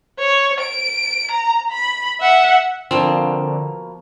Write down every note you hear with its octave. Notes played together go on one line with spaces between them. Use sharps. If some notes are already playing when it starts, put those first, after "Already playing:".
C#5
D7
A#5
B5
E5 F#5
B2 D3 F3 A#3 C4 F5